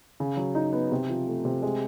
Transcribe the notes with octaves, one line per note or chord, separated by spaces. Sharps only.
C#3
F#3
D#4
B3
C3
F3
A3
C3
G#3